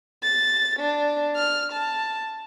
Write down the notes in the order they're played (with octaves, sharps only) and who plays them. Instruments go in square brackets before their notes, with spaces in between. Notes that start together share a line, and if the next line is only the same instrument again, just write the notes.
[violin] A6
D4
F6
A5